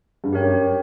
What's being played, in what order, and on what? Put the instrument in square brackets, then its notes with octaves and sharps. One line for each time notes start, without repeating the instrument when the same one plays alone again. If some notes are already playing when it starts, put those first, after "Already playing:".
[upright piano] G2
[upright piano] F#2 [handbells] G4 A#4 C#5 G5